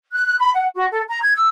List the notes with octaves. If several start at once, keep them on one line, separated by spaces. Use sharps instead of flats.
F#6
F#6
B5
F#5
F#4
A4
A#5
G#6
E6